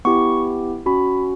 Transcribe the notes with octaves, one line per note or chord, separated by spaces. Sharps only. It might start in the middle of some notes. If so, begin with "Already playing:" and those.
B3 E4 G4 C#6
C#4 F#4 B5